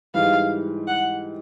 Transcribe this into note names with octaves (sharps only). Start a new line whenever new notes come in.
G#2 E3 G3 F5
F#5